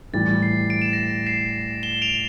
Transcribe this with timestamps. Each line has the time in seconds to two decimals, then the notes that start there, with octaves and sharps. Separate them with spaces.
0.13 A2 E3 G3 A6
0.43 C7
0.70 D7
0.82 E7
0.93 A#6 D7
1.26 C7 E7
1.83 E7 G7
2.02 D7 F7